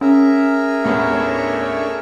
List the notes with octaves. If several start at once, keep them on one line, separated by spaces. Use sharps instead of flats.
C#4 G#4 A#4 E5
D#2 A2 A3 B3 D4 C#5